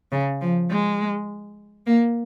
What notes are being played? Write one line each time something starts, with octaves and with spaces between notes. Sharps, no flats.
C#3
F3
G#3
A#3